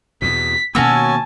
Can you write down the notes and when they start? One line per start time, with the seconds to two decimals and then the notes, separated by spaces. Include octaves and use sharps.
0.22 E2 B2 B6
0.75 B2 D#3 A#3 C#4 F#4 G#5 A5 E6